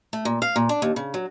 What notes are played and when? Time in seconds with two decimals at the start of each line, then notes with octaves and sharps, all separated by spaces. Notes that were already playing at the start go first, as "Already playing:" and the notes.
0.13 A3
0.25 A#2
0.42 F5
0.56 A#2
0.69 D4
0.82 D#2
0.96 C#3
1.14 F#3